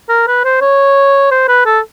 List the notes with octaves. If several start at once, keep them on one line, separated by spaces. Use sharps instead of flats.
A#4
B4
C5
C#5
C5
B4
A4